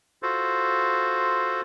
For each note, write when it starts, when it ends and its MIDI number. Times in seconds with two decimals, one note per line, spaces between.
0.23 1.61 65
0.23 1.61 66
0.23 1.61 69
0.23 1.61 72